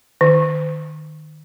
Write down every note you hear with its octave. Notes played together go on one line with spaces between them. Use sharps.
D#3